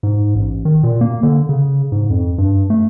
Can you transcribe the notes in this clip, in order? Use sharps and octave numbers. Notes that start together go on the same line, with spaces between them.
G#2
A1
D#3
A#2
A#3
D3
C#3
G#2
F2
G2
A3